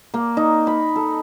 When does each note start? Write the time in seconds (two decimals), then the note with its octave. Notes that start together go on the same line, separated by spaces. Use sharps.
0.14 A#3
0.37 D#4
0.67 B5
0.96 A4